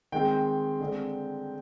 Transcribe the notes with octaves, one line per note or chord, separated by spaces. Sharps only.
D#3 G#3 C4 G5
D3 G#3 C4